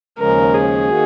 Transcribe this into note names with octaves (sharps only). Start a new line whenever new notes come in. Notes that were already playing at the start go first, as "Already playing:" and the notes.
D#2 C#3 F3 G#3 C#4 A#4
G#4
D#3 A#3 D#4 F#4